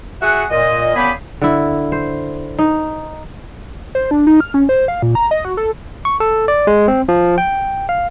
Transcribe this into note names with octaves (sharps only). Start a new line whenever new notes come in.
F#4 G#4 E5 F#5
A#2 D#5
A#2 C#3 B3 G4 G#4 B5
D3 E4
C5
D#4
C5
D4
D#4
F6
C#4
C5
F5
A#2
A#5
D#5
F#4
A4
C#6
A4
D5
G#3
C4
F3
G5
F5